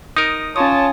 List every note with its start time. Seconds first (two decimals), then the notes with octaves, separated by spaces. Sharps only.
0.17 D#4 A#4 D#6
0.56 C#4 F4 C#5 A5 D#6